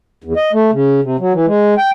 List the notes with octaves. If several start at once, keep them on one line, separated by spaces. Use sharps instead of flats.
E2
D#5
A3
C#3
C3
F#3
E3
G#3
G5